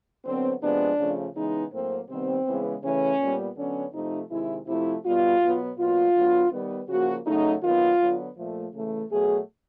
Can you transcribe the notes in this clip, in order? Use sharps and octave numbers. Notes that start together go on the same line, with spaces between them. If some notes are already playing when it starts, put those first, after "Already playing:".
D3 F#3 B3 C4
C3 F3 G#3 B3 D4
C#3 F3 A3
C#3 E3 G#3 B3 D#4
A2 F#3 A#3 C4
C3 D#3 G3 B3 C4
C#3 E3 G#3 B3
C#3 E3 A3 C#4
A#2 G3 B3
D3 F#3 B3 C#4
C3 F3 A3 D#4
C3 D#3 G#3 E4
C3 F3 A3 E4
B2 G3 B3 F4
B2 F#3 B3
B2 F#3 A#3 F4
D3 F#3 B3
D#3 G3 B3
C#3 F3 A#3 F#4
C#3 F#3 A3 D#4
D#3 F#3 B3 F4
D3 F#3 B3
A#2 F3 A3
C#3 E3 A3
B2 F#3 A3 G#4